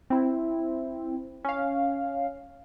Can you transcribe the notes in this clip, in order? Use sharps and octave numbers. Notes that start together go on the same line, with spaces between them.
C4 E4
C#4 F5